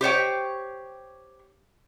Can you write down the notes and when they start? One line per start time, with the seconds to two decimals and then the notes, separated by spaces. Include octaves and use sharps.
0.01 G4 C5 C#5 G5